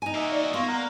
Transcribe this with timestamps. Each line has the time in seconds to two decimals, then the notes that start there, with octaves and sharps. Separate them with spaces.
0.02 D#4 G#5
0.15 A#3 F#4 D#5 E5
0.32 D5
0.54 A#3 B3 F4 C#6
0.68 A#4 F#5 A#5